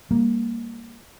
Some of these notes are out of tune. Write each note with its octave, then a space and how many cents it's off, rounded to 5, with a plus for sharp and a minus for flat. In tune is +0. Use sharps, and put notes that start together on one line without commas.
G3 +35 A#3 +5